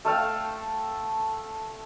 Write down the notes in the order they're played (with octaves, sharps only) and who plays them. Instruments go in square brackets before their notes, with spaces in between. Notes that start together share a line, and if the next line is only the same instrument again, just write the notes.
[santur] A3 A4 F5 G5